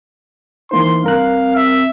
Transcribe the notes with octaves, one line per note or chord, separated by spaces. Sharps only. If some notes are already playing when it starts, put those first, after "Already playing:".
E3 A#3 D#4 C5 C6
G2 C4 A#4 F5 F#6
E5